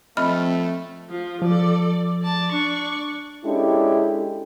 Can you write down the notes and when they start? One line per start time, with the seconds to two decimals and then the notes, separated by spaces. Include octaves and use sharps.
0.17 F3 A3 C4 D#5 B5 F6
1.10 F3 F4
1.42 F3 A4 D5
2.21 D5 A5
2.52 D4 D5 C#6
3.45 G#3 C#4 D4 E4 G4 A4